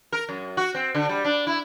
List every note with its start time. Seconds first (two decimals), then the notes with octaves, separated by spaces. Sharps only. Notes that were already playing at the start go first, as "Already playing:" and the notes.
0.12 A#4
0.29 F#2
0.57 F#4
0.75 C4
0.95 D3
1.09 G3
1.24 D4
1.47 E4